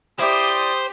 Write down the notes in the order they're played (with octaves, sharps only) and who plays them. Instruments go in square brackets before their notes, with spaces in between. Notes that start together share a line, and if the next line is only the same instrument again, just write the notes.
[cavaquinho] E4 D5 [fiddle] G4 [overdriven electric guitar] C5 [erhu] D#6